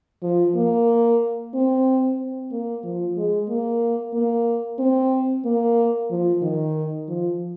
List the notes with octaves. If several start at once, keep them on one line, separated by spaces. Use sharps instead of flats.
F3
A#3
C4
C4
A#3
F3
G#3
A#3
A#3
C4
A#3
F3
D#3
F3